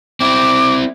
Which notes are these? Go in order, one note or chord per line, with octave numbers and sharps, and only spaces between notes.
C4 E4 D6